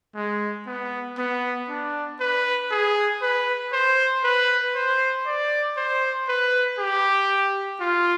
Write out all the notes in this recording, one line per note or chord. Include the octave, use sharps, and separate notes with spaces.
G#3
B3
B3
D4
B4
G#4
B4
C5
B4
C5
D5
C5
B4
G4
F4